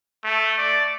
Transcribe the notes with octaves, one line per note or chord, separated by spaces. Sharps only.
A3
D5